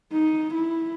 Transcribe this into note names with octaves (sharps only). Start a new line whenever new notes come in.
D#4
E4